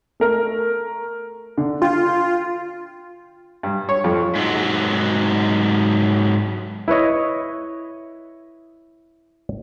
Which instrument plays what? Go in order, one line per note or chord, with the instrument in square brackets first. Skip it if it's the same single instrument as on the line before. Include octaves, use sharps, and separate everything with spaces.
[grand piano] A3 A#4
D3
[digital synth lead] F4 [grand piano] G5
[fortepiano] G2
C#5
F2
[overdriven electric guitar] G#2 F#3
[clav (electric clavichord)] E4 B4 C#5 D#5